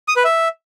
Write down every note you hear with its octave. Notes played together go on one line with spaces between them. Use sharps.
D#6
B4
E5